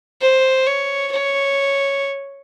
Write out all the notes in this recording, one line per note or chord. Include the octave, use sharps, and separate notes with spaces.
C5
C#5
C#5